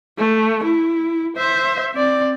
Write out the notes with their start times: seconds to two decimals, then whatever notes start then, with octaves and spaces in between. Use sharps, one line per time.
0.18 A3
0.63 E4
1.37 C5 E5
1.94 C4 D5